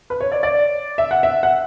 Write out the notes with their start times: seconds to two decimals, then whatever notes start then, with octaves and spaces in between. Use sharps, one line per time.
0.10 B4
0.20 C#5
0.32 D5
0.43 D5
0.98 E5
1.11 F#5
1.23 E5
1.43 F#5